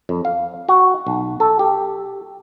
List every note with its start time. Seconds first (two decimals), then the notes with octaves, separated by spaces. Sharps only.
0.09 F2
0.25 F5
0.69 F#4
1.07 B1
1.40 A4
1.59 G4